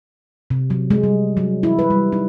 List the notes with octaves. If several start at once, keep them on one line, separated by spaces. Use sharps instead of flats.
C3
F#3
G#3
G3
F#3
E4
B4
G3
D#4